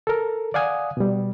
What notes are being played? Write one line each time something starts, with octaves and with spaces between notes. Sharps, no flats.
A4 A#4
D5 F5 F#5 G#5 D#6
B2 G3